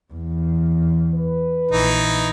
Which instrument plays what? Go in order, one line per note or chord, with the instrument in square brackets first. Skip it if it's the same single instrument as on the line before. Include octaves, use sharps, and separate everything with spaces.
[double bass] E2
[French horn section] B4
[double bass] A#1 [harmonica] E3 D#4